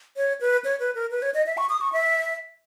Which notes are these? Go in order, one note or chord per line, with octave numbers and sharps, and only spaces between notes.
C#5
B4
C#5
B4
A#4
B4
C#5
D#5
E5
C#6
D#6
C#6
E5